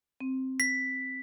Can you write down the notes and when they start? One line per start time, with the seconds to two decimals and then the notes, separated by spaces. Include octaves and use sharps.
0.21 C4
0.60 B6